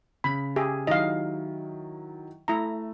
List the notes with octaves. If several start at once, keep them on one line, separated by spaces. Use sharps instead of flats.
C#3 B5
G4 G#4 E5
D#3 F#3 E4 D#5 F5
A3 E4 A#5